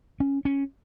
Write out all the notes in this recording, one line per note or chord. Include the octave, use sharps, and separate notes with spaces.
C#4
C#4